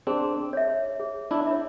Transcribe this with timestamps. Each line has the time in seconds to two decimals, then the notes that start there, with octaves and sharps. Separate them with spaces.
0.07 C4 D4 G#4
0.53 C#5 E5
1.00 G#4
1.31 D4 E4
1.47 C#5 E5